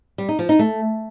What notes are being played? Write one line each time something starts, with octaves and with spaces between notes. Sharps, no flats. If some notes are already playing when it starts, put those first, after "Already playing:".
G3
D#4
F3
D#4
A3